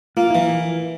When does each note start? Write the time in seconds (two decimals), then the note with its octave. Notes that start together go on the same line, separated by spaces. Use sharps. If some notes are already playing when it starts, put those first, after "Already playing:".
0.17 A#3 F4
0.30 E3 E4